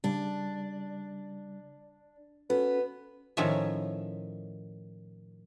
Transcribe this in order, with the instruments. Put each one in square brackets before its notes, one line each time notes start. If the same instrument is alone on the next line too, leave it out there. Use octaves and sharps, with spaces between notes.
[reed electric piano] C#3 G3 [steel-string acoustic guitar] D4
[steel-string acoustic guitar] B3 [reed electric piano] C#4 F#4 A4 [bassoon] B4
[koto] A2 D#3 F3 C#4 A#4 E5